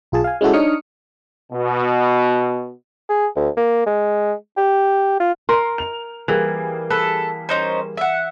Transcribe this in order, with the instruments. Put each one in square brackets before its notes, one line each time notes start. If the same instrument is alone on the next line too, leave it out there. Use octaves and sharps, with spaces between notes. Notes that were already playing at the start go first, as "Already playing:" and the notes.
[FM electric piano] B1 F4 G#4 A5
F5 G#5
G#3 C#4 E4 F#4 A4
D4 D#4 C#5 D#6 F6 C#7
[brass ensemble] B2
[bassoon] G#4
D2
A#3
G#3
G4
F4
[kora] A#4 [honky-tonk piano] C6
[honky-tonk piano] F7
[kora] E3 [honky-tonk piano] G3 A#3 G#4
[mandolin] A4 [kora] B4
[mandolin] C#4 D#4 C5
E5 F#5